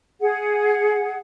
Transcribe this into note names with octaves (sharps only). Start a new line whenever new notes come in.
G#4 F#5